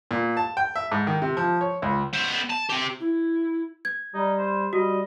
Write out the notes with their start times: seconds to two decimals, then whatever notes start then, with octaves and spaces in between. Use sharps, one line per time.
0.11 A#2
0.37 A5
0.57 G5
0.76 E5
0.92 G#2
1.07 D#3
1.22 C3
1.37 F3
1.61 C#5
1.82 C#2
2.13 B3 C5
2.50 A5
2.70 C4 G4
3.00 E4
3.85 G#6
4.14 G3 D#4
4.39 C5
4.73 G3 F#4 D#5